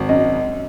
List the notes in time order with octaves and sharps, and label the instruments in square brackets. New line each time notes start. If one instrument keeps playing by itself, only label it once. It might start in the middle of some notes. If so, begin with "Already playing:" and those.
Already playing: [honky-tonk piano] G#1
[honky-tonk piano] F#2 [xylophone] D#5